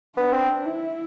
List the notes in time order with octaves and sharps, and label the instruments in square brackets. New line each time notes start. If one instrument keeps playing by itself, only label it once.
[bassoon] B3 [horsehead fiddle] D4
[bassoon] C4
[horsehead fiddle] E4